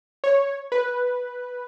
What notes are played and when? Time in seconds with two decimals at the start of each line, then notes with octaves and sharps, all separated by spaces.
0.24 C#5
0.72 B4